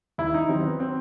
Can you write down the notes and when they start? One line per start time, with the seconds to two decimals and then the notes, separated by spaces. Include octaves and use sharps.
0.18 D#2 E4
0.34 D#4
0.49 D#3 F#3 C4
0.64 B3
0.80 C4